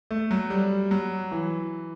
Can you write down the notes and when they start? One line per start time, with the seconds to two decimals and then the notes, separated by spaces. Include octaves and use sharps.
0.11 A3
0.31 F#3
0.50 G3
0.91 F#3
1.32 E3